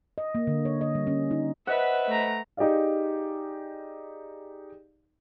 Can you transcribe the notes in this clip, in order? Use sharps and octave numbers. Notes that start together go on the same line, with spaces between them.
D#5
A#3
D3
C#5
D#5
G3
C#4
D#4
B4 C5 D#5 E5 F#5
A3 A#5
D#4 G4 G#4 D5 F5